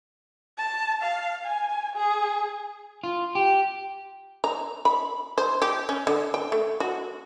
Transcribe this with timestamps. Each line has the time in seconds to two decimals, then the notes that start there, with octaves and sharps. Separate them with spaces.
0.58 A5
1.02 F5
1.45 G#5
1.95 G#4
3.04 F4
3.35 G4
4.44 A#5
4.85 B5
5.38 C5
5.62 G4
5.89 C#4
6.07 D3
6.34 G5
6.52 A3
6.80 F#4